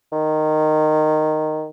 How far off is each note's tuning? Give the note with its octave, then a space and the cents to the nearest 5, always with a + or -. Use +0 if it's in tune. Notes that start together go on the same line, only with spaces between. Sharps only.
D#3 -10